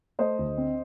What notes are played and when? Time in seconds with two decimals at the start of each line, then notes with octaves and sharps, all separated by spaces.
0.19 A3 C5 D#5
0.39 D2
0.57 C4